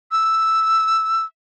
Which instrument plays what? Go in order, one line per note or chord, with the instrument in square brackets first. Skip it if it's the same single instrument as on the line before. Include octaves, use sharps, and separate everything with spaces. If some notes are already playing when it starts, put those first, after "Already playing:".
[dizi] E6